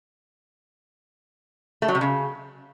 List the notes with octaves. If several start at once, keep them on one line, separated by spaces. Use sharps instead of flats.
A3
F#3
C3
C#3